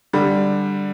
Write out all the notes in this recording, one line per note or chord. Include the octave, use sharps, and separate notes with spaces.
D3 G3